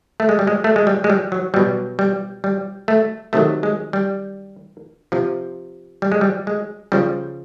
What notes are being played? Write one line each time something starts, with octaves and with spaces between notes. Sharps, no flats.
A3
G#3
G3
G#3
A3
G#3
G3
G#3
G3
F#3
B2 F#3 G3
G3
G3
A3
C3 D#3 F#3 A3
G#3
G3
C3 F3
G3
G#3
G3
G#3
C#3 F3 G3